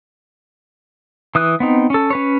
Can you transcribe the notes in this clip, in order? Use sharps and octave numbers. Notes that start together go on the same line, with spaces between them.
E3 D#6 F#6
B3 C4 D#4
C#4 A4
C#4 B4 C#5